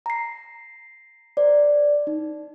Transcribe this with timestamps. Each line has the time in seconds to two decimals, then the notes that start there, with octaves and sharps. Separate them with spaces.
0.06 A#5 C7
1.37 C5 D5
2.07 D#4